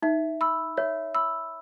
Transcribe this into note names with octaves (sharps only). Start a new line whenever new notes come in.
D#4 E5
B5 E6
C#5 E5
B5 E6